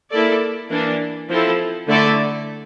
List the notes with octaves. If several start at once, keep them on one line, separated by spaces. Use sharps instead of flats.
A#3 E4 A4 D5
E3 A#3 D4
F3 C4 E4 A4
D3 A3 E4 A4 D5